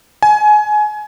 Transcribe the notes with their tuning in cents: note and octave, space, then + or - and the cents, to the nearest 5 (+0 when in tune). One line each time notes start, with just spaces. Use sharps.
G#5 +25